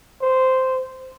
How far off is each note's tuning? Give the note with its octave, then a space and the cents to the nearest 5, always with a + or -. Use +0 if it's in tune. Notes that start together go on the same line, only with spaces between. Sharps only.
C5 -10